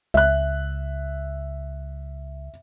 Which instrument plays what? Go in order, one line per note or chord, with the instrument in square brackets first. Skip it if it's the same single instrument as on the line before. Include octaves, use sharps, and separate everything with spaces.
[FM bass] C#2 [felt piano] E5 F#6